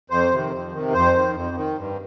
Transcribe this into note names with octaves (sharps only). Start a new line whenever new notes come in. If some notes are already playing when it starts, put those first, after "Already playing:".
F2 C5
C3 D#3
F2
C3 D#3
F2 C5
D#3
F2
D#3
G2